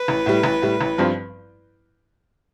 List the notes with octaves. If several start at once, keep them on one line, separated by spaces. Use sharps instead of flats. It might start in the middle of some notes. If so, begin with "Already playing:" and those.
Already playing: B4
A1
A2 G3
A1
A2 G3
A1
G2 F3 C4